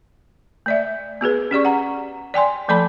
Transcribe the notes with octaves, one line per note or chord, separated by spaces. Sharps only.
A3 D5 E5
B3 F#4 G#4 B4
C#4 G4 D5 C#6
F#5 A#5
D5 G5 G#5 C6
F3 A3 A4 D5 A5 B5